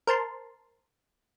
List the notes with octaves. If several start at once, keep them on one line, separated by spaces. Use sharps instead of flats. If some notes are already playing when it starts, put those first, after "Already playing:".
A#4 C5 A5 C6